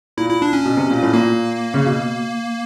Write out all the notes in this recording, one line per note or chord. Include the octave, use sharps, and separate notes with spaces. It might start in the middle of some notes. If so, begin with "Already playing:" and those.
A#2 E4
E4
D4
C#4
B2
C3
A#2
A2
A#2 A#3
C#3
B2